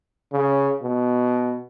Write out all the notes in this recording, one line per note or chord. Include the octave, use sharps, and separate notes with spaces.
C#3
B2